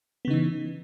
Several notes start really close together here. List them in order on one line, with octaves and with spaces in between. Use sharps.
B3 C#3 D#4 E3